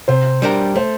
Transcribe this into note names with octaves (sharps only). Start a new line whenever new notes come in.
C3 C5
G3 D4 G4 A#4
A3 C5